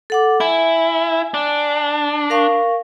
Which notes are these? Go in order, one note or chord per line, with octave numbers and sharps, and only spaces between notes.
A4 F#5 D6
E4 G#5
D4
A#4 F5 C#6